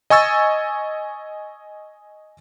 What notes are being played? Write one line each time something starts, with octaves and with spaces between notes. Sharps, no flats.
D#5 G#5 C#6 E6 A6